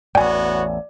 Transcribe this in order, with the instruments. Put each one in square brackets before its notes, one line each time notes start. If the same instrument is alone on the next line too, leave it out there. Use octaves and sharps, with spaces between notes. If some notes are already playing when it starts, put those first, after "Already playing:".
[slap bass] A1 E2 [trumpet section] B3 F#4 C#5 [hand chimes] D5 [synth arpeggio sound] G5 G#5